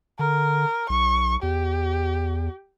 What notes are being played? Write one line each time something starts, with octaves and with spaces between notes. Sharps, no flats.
D3 A#4
B1 C#6
E2 G4